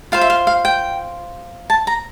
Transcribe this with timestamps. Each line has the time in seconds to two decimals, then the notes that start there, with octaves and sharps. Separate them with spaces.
0.12 F4 C5 F5
0.21 E5
0.30 F5
0.47 F5
0.65 G5
1.70 A5
1.87 A#5